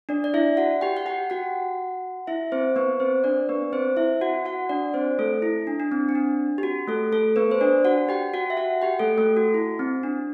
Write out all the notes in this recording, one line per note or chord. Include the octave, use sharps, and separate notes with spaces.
D4 D5
D5
E4 E5
F#4 F#5
G4 G5
F#5
G4 G5
F#4 F#5
E4 E5
C4 C5
B3 B4
C4 C5
D4 D5
B3 B4
C4 C5
E4 E5
F#4 F#5
F#4 F#5
D4 D5
C4 C5
A3 A4
E4
D4
D4
C4
C4
D4
G4
F#4
A3 A4
A3 A4
B3 B4
C5
D4 D5
F#4 F#5
G4 G5
F#4 F#5
E5
F#4 F#5
G4 G5
A3 A4
A3 A4
F#4
E4
C4
D4